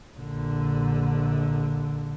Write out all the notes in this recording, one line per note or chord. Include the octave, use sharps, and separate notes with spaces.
A#1 D3